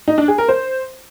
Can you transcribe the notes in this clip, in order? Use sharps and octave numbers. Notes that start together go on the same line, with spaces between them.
D#4
D4
G#4
A#4
C5